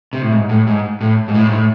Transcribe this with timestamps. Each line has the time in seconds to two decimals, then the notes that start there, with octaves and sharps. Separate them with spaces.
0.13 C3
0.22 A2
0.32 G#2
0.49 A2
0.67 G#2
1.01 A2
1.28 G#2
1.34 A2
1.47 G#2
1.52 A2